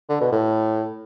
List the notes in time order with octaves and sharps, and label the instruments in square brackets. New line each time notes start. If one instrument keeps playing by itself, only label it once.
[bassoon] D3
B2
A2